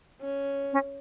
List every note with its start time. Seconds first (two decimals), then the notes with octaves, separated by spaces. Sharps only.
0.21 C#4
0.73 C#4